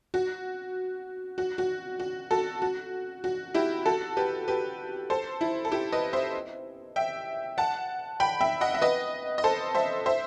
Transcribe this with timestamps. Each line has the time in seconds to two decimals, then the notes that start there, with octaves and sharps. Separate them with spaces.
0.14 F#4
1.38 F#4
1.58 F#4
2.00 F#4
2.31 F#4 A4
2.62 F#4
3.24 F#4
3.54 E4 G4
3.86 F#4 A4
4.17 G4 B4
4.48 G4 B4
5.10 A4 C5
5.41 E4
5.65 A4
5.72 E4 G4
5.92 B4 D#5
6.13 C5 E5
6.96 E5 G5
7.58 F#5 A5
8.20 G5 B5
8.41 E5 G5
8.61 D#5 F#5
8.74 E5
8.82 B4 D#5
9.38 D#5
9.44 A4 C5
9.75 C5 E5
10.06 C5 E5